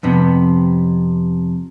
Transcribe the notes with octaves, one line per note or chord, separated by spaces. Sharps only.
F2 C3 B3